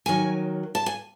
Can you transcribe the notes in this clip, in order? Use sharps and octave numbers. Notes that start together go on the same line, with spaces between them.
D#2 D#3 F#3 G#5
A5
G#5